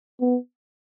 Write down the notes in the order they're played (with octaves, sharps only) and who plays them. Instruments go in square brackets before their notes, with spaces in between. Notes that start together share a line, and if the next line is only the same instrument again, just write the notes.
[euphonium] B3